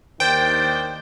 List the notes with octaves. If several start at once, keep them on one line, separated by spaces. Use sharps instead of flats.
D#2 D#3 D4 C5 G5